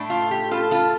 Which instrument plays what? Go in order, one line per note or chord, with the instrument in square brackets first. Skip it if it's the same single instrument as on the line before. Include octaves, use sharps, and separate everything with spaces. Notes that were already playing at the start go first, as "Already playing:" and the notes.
Already playing: [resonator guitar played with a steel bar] A2 A3 D4
F4
G4
F4 A4
F4 A4